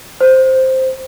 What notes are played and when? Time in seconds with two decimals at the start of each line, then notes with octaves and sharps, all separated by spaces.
0.21 C5